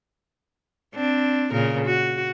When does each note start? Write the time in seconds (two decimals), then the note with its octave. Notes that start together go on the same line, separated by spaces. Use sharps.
0.95 C4 D4
1.51 A#2 C#3 A#4
1.84 F#4